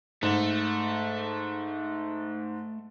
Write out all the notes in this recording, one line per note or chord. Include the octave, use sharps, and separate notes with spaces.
G#2 A3